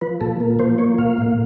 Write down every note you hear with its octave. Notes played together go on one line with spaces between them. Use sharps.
F3 B4
A#2 A4
A#3
F3 C5
A#3 C#5
A#2 F5
A2